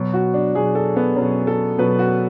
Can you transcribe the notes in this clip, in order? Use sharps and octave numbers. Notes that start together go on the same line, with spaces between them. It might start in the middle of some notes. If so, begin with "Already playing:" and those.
Already playing: B2 F#3
F#4
D4
B2 F#3 G#4
A4
B3
B2 F#3 C#4
A4
B2 F#3 B4
F#4